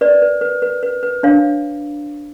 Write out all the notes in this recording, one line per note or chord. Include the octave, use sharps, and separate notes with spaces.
B4 D5
B4
B4
B4
B4
B4
D4 C#5 F5